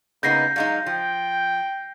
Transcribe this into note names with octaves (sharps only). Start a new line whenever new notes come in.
C#3 A#3 B3 D#4 G6 A#6 C7
F#3 G#3 D#4 F5
F3 G5